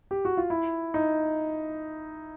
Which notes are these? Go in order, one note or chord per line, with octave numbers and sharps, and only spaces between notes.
G4
F#4
F4
E4
D#4